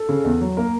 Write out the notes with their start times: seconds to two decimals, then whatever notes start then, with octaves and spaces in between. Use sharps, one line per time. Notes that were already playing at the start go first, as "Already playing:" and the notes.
Already playing: A4
0.09 C#3
0.24 E2
0.41 F#3
0.57 A#3 A#4